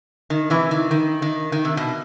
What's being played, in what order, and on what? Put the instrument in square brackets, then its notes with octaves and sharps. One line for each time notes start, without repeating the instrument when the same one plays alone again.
[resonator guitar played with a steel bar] D#3
C3 E3
D#3
D#3
D#3
D#3
C3
B2